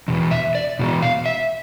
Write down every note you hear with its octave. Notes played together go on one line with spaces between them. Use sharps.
E2 B2
E5
D5
E2 B2
F5
E5